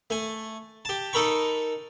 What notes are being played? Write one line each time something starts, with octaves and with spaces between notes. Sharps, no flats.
A3 G#5
G4 A5
D#4 A4 A#4 B5 C#6